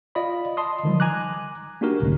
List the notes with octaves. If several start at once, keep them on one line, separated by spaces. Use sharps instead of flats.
F4 D5 D#5 F5 B5
D#5 A5 C6 D#6
D3 D#3 F3 G3
G#5 A#5 D6 F#6
A#3 D4 D#4 F#4 G4 A#4
G1 C2 A2 D3 A3 C#4